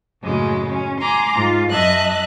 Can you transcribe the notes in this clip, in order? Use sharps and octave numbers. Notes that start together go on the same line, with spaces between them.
F#2 A2 C#3 F#3 G#3 A#3
C#4
G#5 A#5 C6 D6
G#2 F4
F#2 D#5 E5 A5 F#6